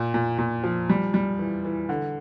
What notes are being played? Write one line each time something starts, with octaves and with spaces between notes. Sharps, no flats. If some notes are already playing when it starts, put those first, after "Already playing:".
Already playing: A#2
A#2
A#2
F3
G3
G3
E3
E3
D3